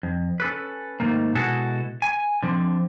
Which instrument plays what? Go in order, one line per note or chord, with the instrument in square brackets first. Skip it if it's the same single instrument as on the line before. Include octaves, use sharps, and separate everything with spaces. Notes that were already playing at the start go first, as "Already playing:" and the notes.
[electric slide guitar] F2
C#4 A4 B4
G#2 D#3 A3 A#3
B2 G#3 E4 F#4 A4
G#5
D3 F3 C4